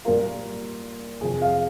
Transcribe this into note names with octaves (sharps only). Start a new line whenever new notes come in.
A#2 G3 A#3 F4 A#4
F2 C3 F3 C4 G#4
F5